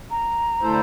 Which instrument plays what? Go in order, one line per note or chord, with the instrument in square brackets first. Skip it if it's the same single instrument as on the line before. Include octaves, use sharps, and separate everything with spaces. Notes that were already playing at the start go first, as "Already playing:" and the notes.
[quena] A#5
[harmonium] D3 A3 E4 A4 C5